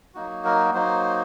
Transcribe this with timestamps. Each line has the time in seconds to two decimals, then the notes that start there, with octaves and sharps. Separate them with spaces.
0.15 F#3 A#3 D#4 F#4
0.45 A#4
0.74 F#3 A#3 D#4 F#4 C5